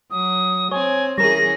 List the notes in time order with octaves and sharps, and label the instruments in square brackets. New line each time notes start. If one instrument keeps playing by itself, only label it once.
[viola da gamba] F#3 [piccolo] D#6
[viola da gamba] C4 [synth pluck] C#5 [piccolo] G#5
[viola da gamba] E3 C#4 G#4 [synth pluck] G3 A#4 [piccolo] A#6